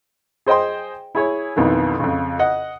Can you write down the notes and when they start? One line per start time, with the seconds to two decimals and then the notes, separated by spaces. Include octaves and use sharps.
0.46 G#4 C5 D#5 G5 C6
1.15 E4 G#4 C#5
1.56 B1 F2 D#3 E3
2.00 F2 C#3
2.39 D#5 F#5